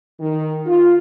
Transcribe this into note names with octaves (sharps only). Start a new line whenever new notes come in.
D#3
F4